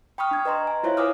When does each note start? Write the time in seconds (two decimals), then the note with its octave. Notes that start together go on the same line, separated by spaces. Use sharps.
0.18 G5 B5 C#6 D#6 F6
0.31 D4 G#6
0.45 B4 D#5 A#5 C6
0.67 G#5
0.83 E4 F4 C5 C#5 E5 F5
0.97 B4 F5 G#5 D6 D#6 F6